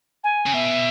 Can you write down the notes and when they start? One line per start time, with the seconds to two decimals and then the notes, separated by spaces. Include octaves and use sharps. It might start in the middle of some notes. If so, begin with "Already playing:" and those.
0.23 G#5
0.46 C#3
0.53 B2 E5